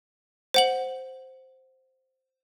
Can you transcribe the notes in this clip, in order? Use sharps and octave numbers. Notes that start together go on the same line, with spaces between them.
C5 F#5 F#7